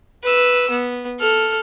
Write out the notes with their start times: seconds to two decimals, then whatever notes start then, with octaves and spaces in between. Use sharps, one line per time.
0.23 B4 E6
0.70 B3
1.20 A4 F6